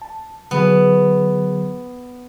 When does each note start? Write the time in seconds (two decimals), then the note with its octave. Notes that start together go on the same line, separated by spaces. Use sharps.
0.02 A5
0.51 D3 F#3 B3 G#4